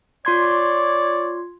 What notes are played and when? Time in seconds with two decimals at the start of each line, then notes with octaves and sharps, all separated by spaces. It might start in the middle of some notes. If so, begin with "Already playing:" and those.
0.25 F4 C#5 D5 C6 G#6